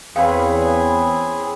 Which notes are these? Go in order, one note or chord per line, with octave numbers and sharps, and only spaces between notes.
E2 C4 C#4 G#4 B4 F5